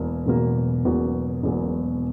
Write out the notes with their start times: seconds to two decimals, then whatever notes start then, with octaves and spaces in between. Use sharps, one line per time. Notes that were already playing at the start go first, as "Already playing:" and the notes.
Already playing: E1 E2 B2 A#3
0.26 E1 E2 B2 A#3
0.85 E1 E2 B2 A#3
1.43 E1 E2 B2 A#3